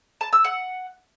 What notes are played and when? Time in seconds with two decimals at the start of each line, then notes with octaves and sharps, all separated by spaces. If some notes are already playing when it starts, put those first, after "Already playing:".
0.21 A5
0.33 E6
0.44 F#5